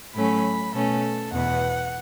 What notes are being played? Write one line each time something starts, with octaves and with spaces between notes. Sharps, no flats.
A2 F#3 A3 C#4 B5
B2 A3 C#4 A4
E2 B2 B3 F#5